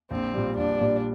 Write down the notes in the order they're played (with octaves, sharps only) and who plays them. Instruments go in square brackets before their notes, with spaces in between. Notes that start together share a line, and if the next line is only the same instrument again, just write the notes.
[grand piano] A#1 [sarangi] C4
[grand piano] A#2 G3
[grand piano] A#1 [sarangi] D4
[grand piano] A#2 G3